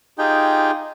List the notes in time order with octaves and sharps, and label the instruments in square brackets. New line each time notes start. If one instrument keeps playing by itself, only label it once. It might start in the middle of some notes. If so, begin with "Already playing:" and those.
[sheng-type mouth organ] D#4 F4 G4 G#4 G5